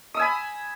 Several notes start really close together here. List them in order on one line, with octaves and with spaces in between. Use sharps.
D#6 E6 G#5 B5